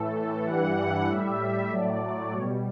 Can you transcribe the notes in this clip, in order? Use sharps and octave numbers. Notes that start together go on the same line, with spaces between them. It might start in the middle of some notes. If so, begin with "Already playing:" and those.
Already playing: A2 E3 A3 A4
G2 E3 G3 F#5
A2 G3 E5
A2 F#3 A3 D5
B2 G3 C#5